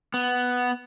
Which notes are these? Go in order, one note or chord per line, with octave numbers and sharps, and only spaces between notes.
B3